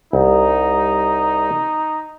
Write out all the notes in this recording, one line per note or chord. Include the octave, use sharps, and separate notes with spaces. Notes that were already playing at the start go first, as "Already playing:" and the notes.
C2 D#4